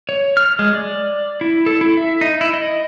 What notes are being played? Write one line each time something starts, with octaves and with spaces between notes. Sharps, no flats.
C#5
F6
G#3
D5
E4
A4
E4
E5
D#4
E4
D#5